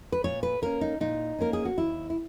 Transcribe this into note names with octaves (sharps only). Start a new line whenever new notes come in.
B4
A#2 C#5
B4
A#3 C#4 A#4
D#4
A#2 D#4
A#3 C#4 A#4
G#4
F#4
D#2 E4
E4